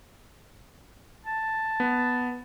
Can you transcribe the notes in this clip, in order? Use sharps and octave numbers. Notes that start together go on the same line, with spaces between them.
A5
B3